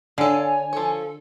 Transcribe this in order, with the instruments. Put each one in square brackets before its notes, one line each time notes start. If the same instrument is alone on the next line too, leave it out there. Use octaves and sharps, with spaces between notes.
[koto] D3 [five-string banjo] A4 F5 [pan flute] C#5 [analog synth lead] G#5
[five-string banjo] F3 C#5 [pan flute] A4